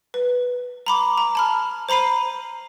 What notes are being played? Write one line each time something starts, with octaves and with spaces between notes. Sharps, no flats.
B4
A#5 B5 D6
A#5
A5 B5 F6
C5 A#5 B5 C7 D#7